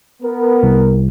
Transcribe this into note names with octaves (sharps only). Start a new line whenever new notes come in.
B3 A#4
C2